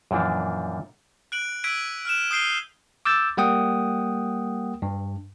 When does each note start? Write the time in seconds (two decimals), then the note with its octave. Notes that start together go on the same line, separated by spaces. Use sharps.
0.11 F#2 A#2 E3 F3 D4
1.32 F#6 D7 F#7
1.64 E6 G#6 B6 D7 D#7
2.05 F6 F#6 E7
2.31 D#6 G6 C7 D#7 G7
3.05 D6 E6 G6 A6
3.37 G3 A#3 F#5 G5 D#6
4.82 G2